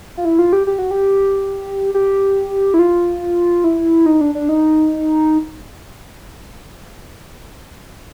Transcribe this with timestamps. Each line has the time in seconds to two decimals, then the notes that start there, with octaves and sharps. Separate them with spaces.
0.17 F4
0.25 E4
0.39 F4
0.53 G4
0.67 G4
0.79 F#4
0.91 G4
1.94 G4
2.74 E4
2.79 F4
3.64 E4
4.06 D#4
4.21 D4
4.35 D4
4.49 D#4